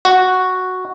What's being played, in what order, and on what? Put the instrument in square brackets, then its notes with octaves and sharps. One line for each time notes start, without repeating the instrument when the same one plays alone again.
[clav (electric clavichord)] F#4